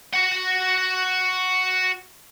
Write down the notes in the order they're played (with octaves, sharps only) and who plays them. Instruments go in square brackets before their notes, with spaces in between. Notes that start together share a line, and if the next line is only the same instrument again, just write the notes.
[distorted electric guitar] F#4 F#5